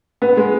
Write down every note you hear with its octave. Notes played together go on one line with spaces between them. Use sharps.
B3
G#3